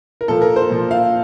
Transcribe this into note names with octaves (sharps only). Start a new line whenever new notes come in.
A#4
A#2 F3 A4
A#4
C5
A#2 F3
F5